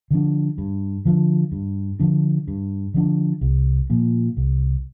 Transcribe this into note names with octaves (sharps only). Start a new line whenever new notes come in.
D3 F3 D4
G2
D3 F3 D4
G2
D3 F3 D4
G2
D3 F3 D4
C2
A#2 F3
C2